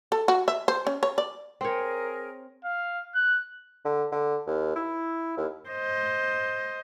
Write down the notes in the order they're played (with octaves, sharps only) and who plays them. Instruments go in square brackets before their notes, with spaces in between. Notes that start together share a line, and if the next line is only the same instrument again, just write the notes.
[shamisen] A4
F#4
E5
C5
C#4
C#5
D5
[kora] C4 C#5 [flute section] G#4 A#4
[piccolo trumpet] F5
F#6
[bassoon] D3
D3
D#2
E4
D#2
[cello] C5 D#5